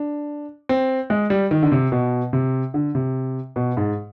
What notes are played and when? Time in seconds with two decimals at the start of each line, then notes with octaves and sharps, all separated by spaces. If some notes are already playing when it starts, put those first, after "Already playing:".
Already playing: D4
0.69 C4
1.10 G#3
1.30 G3
1.51 D#3
1.62 D3
1.72 C3
1.92 B2
2.33 C3
2.74 D3
2.95 C3
3.56 B2
3.77 G#2